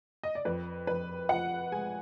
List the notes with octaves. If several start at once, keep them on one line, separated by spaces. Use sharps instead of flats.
D#5
D5
F2 B4
F2 B4
F3 F#5
G#3 G#5